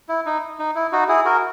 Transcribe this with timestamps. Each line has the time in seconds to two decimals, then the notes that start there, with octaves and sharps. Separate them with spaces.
0.09 E4
0.26 D#4
0.59 D#4
0.75 E4
0.92 D#4 F#4
1.09 E4 G#4
1.25 F#4 A#4